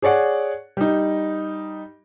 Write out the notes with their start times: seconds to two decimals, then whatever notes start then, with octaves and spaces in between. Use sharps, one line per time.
0.02 G#4 C#5 D5 F#5
0.77 G3 D#4